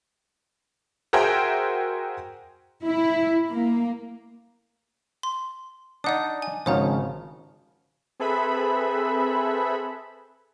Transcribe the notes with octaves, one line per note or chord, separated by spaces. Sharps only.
F#4 G#4 A#4 C5 E5 G5
E4
A#3
C6
D4 D#4 D5 F#5 D#6
G#5
G#1 C#3 F3 C#5 F#5 A#5
C4 G#4 A4 B4 E5 B5